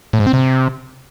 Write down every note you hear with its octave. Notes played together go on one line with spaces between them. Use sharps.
A2
G#2
C4
C3